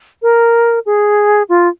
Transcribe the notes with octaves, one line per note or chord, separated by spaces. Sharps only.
A#4
G#4
F4